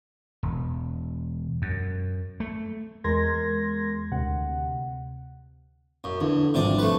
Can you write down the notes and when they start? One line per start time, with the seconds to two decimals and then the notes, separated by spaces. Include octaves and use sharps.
0.43 E1
1.62 F#2
2.40 A3
3.04 E2 G#3 A#4 C6 G#6 A#6
4.11 D2 C3 F#5
6.04 F#2
6.21 E2 D3
6.54 G#1 G2 C3 F3 D5
6.79 A3 B4